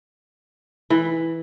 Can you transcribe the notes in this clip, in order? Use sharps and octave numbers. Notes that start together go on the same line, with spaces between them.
E3